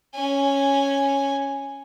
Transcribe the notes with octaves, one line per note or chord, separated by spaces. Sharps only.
C#4 G#5